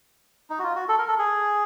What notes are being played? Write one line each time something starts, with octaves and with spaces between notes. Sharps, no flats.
D#4
F#4
F4
F#4
A4
A#4
A4
G#4